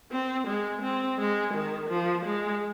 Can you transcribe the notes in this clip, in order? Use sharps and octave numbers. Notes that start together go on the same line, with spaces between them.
C4
G#3
C4
G#3
D#3
F3
G#3